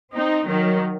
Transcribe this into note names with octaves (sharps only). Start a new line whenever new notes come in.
C4 D#4
D#3 F#3